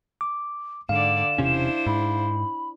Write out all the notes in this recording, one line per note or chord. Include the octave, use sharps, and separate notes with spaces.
D6
G#2 D3 D5 F5 E7
E1 C3 C#4 D4 E4 C5
G#2 B5